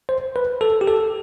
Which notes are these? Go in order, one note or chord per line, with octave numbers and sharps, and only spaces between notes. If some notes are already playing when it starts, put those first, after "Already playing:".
C5
B4
A4
G4
A4